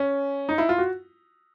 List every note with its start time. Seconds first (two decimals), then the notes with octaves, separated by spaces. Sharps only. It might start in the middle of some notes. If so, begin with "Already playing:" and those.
Already playing: C#4
0.49 D#4
0.58 E4
0.69 F4
0.78 F#4